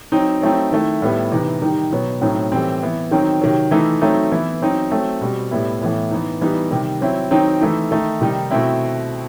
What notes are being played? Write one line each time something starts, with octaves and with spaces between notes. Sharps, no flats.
F#3 C4 D#4
F#3 A3 C4 D#4
D#3 A3 E4
A2 G3 B3 E4
C3 E3 B3 D#4
D#3 G3 D#4
B2 F#3 B3 D#4
A2 F#3 C4 D#4
A2 E3 G3 C4
E3 B3 E4
D#3 F#3 C4 D#4
C3 D#3 F#3
E3 A3 D#4
F#3 A3 C4 D#4
E3 B3 E4
F#3 C4 D#4
F#3 A3 C4
B2 G3 C4
A2 G3 B3 E4
A2 E3 B3 E4
E3 B3 D#4
E3 G3 B3 D#4
C3 D#3 G3
F#3 C4 E4
D#3 F#3 C4 D#4
E3 A3 D#4
D#3 A3 D#4
C3 D#3 G3 D#4
B2 A3 C4 E4